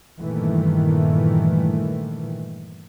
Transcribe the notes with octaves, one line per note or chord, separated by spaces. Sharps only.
G2 A#2 D#3 E3 A3